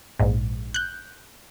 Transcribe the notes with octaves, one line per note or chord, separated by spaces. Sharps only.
A#1 G#2
F#6 G6